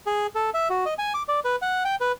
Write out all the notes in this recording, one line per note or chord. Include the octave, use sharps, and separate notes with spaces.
G#4
A4
E5
F#4
D#5
G#5
D6
D5
B4
F#5
G5
B4